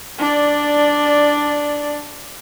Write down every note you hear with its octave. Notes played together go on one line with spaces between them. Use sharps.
D4 D5